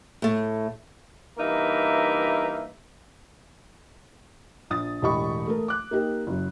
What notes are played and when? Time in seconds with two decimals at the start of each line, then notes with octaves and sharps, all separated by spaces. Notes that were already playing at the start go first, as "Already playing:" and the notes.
0.22 A2 A3
1.38 G2 E3 A#3 D#4 A#4 E5
4.70 A#1 D#6 A6
5.02 E1 A2 G4 D#5 B5 C#6
5.48 A3 A#4
5.68 D6 F#6
5.91 A#3 D#4 G4 A#4
6.27 F#1 F#3